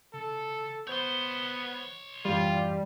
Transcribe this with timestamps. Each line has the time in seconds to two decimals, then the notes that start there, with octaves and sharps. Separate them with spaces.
0.14 C#3 A4
0.87 B3 C5 C#5 C6 G6
2.25 F#2 A2 E3 G3 F4